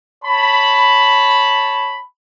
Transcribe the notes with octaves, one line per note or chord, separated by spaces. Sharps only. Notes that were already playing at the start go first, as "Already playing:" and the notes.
C#5 A5 B5